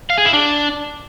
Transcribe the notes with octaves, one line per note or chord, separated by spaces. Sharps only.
F5
G#4
E4
D4